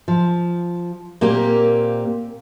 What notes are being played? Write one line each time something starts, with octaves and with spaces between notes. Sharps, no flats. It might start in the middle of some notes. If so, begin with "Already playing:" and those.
F3
A#2 A#3 C4 G4